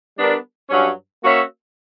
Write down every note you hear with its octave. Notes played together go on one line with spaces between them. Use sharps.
G3 B3 D4 A#4
G2 F#3 C#4
A#3 C#4 F#4 C#5 E5